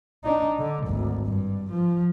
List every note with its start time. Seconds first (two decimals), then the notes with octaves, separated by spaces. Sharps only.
0.24 D4 D#4
0.59 D3
0.87 G#1 D2
1.26 G2
1.72 F3